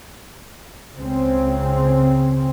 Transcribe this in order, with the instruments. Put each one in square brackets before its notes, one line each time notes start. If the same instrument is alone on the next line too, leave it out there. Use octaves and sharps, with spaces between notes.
[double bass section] C#2 C#3 C4